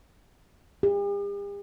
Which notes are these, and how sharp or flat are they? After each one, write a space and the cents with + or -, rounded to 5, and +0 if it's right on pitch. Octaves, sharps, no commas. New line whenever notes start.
G4 +45